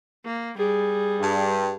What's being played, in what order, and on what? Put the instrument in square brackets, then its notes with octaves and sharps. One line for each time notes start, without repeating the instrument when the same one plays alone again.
[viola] A#3
[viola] G3 [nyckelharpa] G#4
[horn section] G2